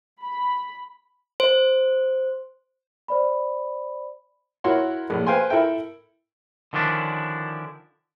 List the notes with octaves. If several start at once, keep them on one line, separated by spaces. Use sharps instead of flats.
B5
C5
C5 D5 B5
E4 F#4 A#4 C#5 F#5 C6
A#1 A2
B4 C5 F5 G5 G#5 C6
E4 A4 A#4 E5 G5
D3 D#3 F3 C#4 D4 E4